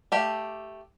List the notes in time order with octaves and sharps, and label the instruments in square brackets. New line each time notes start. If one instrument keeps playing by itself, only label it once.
[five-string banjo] A3 G4 F5